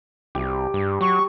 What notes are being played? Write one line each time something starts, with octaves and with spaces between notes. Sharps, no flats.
C2 G4
G2
F#3 C#6